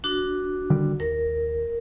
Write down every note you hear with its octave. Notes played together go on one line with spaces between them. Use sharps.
D4 F#4
D3 D#3 G3
D#2 A#4